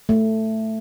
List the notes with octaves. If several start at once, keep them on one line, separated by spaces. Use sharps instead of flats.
A3